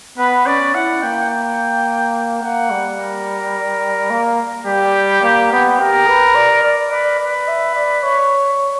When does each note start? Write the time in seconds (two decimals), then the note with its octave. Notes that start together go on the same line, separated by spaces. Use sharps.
0.17 B3 B4
0.46 C#4 D5
0.74 E4 F#5
1.02 A#3 G5
1.30 G5
2.43 A#3 F#5
2.70 G3
2.98 A#4
4.10 A#3
4.66 G3 G4
5.23 A#3
5.51 B3
5.79 G4 A#4
6.08 B4
6.35 D5
6.63 D5
6.91 B4 D5
7.19 B4 D5
7.48 E5
7.75 D5
8.03 C#5